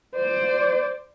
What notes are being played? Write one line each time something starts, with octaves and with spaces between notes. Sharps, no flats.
C5 D5